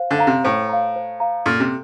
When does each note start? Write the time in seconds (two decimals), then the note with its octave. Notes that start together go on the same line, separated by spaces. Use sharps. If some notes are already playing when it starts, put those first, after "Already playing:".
Already playing: C5 F5
0.11 D3
0.19 F5 A#5
0.27 C3
0.44 A2 C5
0.69 F5 A#5
0.96 C5
1.20 F5 A#5
1.46 A#2 A4
1.60 C3